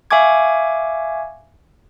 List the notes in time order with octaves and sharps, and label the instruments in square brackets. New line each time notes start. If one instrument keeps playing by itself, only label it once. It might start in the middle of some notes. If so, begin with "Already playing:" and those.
[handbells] E5 F5 G#5 C#6 D6 G#6